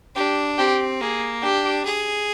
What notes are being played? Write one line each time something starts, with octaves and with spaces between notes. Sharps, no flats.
D4 G4
C4 G4
A#3 G#4
D4 G4
G#4